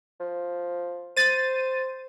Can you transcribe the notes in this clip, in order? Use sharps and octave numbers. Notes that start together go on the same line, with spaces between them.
F3
C5 A6 D#7